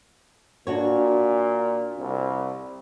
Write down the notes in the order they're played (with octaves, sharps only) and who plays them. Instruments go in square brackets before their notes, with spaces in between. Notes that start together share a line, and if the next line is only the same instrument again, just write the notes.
[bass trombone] A#2 [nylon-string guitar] D4 F#4 C#5
[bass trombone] C2